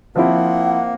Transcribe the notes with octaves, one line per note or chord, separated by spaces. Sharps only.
F3 A#3 C4 E4 F#5